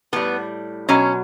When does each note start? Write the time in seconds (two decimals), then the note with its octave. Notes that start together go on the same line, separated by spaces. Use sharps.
0.13 A2 G3 B3
0.89 B2 F#3 C#4